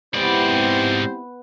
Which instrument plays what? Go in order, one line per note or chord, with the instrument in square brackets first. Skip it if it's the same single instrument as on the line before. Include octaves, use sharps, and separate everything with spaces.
[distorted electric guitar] G#2 D5 [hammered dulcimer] B3 [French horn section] C4 E4 G4 [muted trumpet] C5